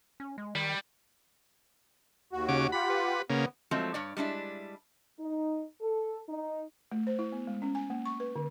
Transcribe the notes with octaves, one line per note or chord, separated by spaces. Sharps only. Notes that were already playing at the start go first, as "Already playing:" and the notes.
C#4
G#3
D#3 G3
D#2 F#4
C#3 D6
F4 G4 F#5 B5
B4
C#3 A#3 B3
F3 F#3 G#3 A3 C4
G2 C#5 D5
G3 G#3 D4 E4
D#4
A4
D#4
A3
C5
E4
B3
G#3
C#4
G#5
A#3
C#6
B4
D3